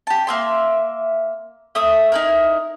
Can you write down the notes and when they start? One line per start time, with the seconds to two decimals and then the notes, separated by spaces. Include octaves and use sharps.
0.07 G4 A5
0.27 A#3 E5 C6
1.75 A3 E5 D#6
2.12 D#4 E4 A#4